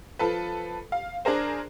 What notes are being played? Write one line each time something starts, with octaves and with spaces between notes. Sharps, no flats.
F3 A4 B4
F5
D4 G#4 A#4 C5